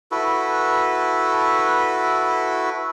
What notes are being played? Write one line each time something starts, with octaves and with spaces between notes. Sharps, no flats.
E4 F#4 A4 B4